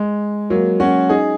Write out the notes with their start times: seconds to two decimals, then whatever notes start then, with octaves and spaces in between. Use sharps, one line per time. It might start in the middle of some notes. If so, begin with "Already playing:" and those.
Already playing: G#3
0.50 F#3 A#3
0.80 C#4 F#4
1.09 D#4 G#4